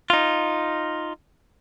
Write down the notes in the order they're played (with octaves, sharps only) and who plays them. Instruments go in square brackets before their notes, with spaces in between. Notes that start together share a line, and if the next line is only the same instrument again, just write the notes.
[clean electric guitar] D#4 F4